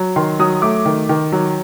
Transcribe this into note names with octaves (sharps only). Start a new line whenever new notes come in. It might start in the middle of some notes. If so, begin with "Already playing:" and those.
Already playing: F#3
D#3 C6
F#3 D#6
A3 D6
D#3
D#3
F#3